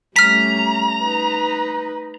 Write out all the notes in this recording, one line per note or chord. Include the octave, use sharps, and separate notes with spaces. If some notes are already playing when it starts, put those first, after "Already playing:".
G3 A3 C#4 A#5 F6 B6
D#4 B4